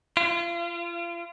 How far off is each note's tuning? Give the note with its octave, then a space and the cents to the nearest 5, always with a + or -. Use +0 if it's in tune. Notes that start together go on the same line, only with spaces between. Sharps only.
F4 -35